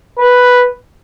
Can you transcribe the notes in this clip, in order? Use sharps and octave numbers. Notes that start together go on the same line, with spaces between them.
B4